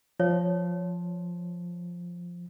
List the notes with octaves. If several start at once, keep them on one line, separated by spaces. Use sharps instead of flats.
F3 C#5